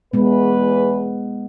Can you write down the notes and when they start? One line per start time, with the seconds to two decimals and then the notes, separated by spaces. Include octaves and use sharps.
0.13 E2 G#3 B3 B4